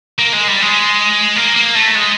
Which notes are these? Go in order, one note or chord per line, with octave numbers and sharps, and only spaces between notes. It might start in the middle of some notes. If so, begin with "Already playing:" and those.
A#3
G#3
G3
G#3
A#3
A#3
A3
G#3